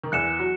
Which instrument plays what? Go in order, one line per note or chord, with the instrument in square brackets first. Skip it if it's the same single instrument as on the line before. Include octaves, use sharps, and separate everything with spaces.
[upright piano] D#3
[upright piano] E2 E3 [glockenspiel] F#6 C#7 E7
[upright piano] F#3